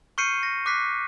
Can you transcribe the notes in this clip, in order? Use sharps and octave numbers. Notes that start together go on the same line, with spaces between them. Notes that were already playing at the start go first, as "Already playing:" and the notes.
C#6 F6 G6 C7 C#7 D#7
A#6
D6 F#6 B6 C7